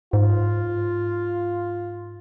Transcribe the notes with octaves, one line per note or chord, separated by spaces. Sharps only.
G#2 F4